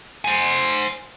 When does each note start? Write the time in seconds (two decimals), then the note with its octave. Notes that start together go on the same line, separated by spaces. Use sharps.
0.25 C5 G#5